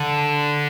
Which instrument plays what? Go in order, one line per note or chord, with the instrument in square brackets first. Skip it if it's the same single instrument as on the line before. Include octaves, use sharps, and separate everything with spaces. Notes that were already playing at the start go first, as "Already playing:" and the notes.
Already playing: [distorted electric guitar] D3